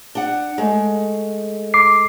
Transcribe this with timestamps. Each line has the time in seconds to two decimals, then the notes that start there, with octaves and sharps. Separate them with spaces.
0.15 D4 F#5
0.58 G#3 A3
1.74 D6 C7